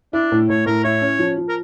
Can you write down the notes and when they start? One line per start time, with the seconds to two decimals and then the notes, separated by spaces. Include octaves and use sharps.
0.13 D4 E4
0.32 A2
0.49 A2 C#5
0.66 A2 A#4
0.84 E4 C#5
1.02 C#4
1.19 F3
1.37 F3
1.48 A#4